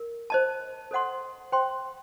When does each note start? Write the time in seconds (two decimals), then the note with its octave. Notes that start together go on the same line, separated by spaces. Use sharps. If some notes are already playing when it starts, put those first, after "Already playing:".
Already playing: A#4
0.30 C5 D#5 A5
0.91 A4 C5 D#5 F#5 C6
1.52 C5 G5 C6